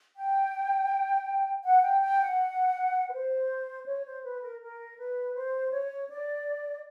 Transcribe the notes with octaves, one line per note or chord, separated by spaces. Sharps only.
G5
F#5
G5
G5
F#5
B4
C5
C#5
C5
B4
A#4
A#4
B4
C5
C#5
D5